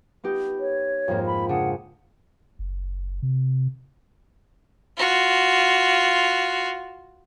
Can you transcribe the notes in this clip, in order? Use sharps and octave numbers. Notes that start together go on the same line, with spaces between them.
B3 D#4 G4
C#5
F2 G#2 A#3
B5
C#3 D4 G#4 F#5
F#1
C3
F4 F#4